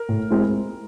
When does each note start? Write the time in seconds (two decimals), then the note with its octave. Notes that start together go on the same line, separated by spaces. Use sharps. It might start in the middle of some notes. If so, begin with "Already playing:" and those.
Already playing: A#4
0.09 A2
0.30 G#3 C4 E4